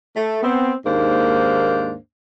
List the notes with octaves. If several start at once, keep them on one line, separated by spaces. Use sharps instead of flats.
A3
B3 C4
D#2 G#2 A#3 D4 C5